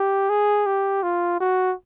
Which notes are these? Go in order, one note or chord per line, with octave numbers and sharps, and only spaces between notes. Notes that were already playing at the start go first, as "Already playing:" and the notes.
Already playing: G4
G#4
G4
F4
F#4